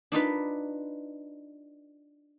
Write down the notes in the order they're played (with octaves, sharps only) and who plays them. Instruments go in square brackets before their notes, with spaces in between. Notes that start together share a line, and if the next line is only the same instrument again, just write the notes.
[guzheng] D4 D#4 F4 B4